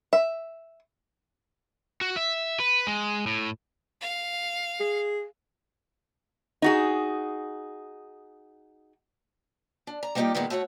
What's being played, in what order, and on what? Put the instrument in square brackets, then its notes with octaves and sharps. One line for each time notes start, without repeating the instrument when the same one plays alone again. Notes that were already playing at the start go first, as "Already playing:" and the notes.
[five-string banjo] E5
[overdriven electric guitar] F#4
E5
B4
G#3
A2
[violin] F5
[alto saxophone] G#4
[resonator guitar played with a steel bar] D#4 F#4 G#4
[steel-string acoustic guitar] D4
A#5
G3 A#3 B3 D#4 F4 G4
A#2 D#3 G#3 A#3 B3
A3 F#4 C#5 D#5 F#5